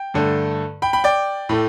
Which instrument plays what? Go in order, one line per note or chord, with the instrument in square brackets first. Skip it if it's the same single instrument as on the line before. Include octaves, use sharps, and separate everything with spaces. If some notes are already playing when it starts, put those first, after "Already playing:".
Already playing: [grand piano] G5
G2 D3 A3
G5 B5
G5 B5
D5 G5
A2 A3